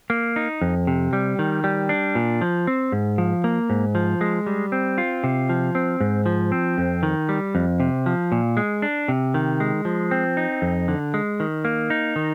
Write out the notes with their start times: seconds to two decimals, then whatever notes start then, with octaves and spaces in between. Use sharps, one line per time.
0.10 A#3
0.36 D#4
0.61 F2
0.87 C3
1.13 G3
1.39 D#3
1.64 G3
1.89 D4
2.15 A#2
2.41 F3
2.67 C4
2.92 G#2
3.18 F3
3.44 A#3
3.70 G#2
3.95 F3
4.21 G#3
4.47 G3
4.72 C4
4.98 F4
5.24 C3
5.49 F3
5.75 C4
6.00 G#2
6.26 F3
6.52 C4
6.78 F2
7.03 D#3
7.29 G3
7.55 F2
7.80 C3
8.06 F3
8.32 A#2
8.57 G#3
8.82 D4
9.08 C3
9.34 D#3
9.60 G#3
9.85 F3
10.11 C4
10.37 D#4
10.62 F2
10.88 D3
11.14 G#3
11.40 D#3
11.65 A#3
11.90 D#4
12.16 D#3